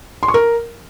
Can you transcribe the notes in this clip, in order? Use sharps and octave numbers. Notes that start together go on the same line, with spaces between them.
C6
C#6
A#4